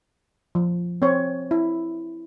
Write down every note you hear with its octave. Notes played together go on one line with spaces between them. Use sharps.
F3
C4 C#5
E4